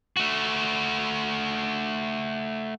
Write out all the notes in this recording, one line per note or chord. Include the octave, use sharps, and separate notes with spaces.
A3 F#4